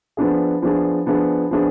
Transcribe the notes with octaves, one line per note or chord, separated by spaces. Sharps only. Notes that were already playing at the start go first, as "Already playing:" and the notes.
F3 B3 D4 G#4
F3 B3 D4 G#4
F3 B3 D4 G#4
F3 B3 D4 G#4